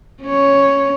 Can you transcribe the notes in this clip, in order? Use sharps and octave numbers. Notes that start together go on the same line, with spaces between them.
C#4 C#5